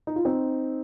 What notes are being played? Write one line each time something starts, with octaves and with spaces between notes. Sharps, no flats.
D#4
F4
C4 D#4